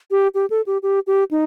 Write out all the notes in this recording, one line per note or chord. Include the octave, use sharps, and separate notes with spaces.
G4
G4
A4
G4
G4
G4
D#4